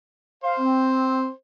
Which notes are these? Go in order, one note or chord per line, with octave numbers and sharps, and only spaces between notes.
C5 F5
C4